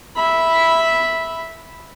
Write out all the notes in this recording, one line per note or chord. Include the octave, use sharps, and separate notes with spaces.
E5 B5